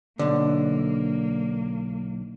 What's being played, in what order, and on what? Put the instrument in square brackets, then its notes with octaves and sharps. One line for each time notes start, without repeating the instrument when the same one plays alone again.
[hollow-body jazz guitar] B1 D3 [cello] A#3